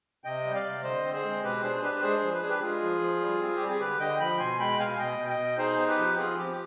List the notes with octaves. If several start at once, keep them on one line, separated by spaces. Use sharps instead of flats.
C3 D#5 G5
G3
D5 F5
C3
D3 C5 D#5
C4
G#4 C5
G#3
B2 G4 B4
D4 G#4 C5
D4 G4 B4
B4
G#3 G#4 C5
F3
B4
D4 G#4
G4 B4
G#3 F4 G#4
F3
F3
G3
C4 F4
G4
G3
G#4
D3 G4 B4
D3 D#5 G5
F3 G5 B5
B2 G#5 C6
G#3 G5 B5
B2 F5 G#5
F5
B2 D#5 G5
B2
D#5 G5
B2
D#4 G#4 C5
B3 G#4
G4 B4
F3
C4 F4 G#4
F3 G4